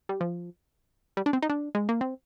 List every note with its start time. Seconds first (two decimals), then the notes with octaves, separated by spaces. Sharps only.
0.09 G3
0.21 F3
1.17 G3
1.26 D4
1.33 C4
1.42 D#4
1.50 D4
1.75 G#3
1.89 A#3
2.01 C4